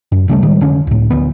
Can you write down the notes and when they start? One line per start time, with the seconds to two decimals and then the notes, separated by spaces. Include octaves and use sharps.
0.12 F#2
0.28 D2 C#3 G3 A3
0.42 A2 D#3 G3 G#3
0.61 F1 D3 C#4
0.87 C#2 A2
1.10 D1 D2 B3